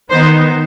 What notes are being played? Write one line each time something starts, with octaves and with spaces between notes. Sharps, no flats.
D#3 B3 D#4 C5